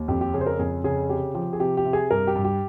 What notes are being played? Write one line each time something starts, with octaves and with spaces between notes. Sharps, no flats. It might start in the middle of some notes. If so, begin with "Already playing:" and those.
Already playing: D#2
F2 G4
G4
C#3 G#4
C5
A#4
F2 G#4
C#3 G#4
C3 G4
F3 G4
G#4
C3 G4
G4
C3
G#4
G2 A#4
G4
G2
G4